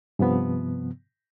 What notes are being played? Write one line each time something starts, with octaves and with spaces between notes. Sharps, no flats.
G2 C3 F3 B3